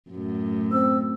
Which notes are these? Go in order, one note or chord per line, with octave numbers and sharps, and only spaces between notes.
F#2 A2
C4 E6